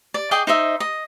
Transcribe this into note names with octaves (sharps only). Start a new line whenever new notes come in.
D5
G#4 D#5 G5 D6
D#4 C5 D#5 E5
D#5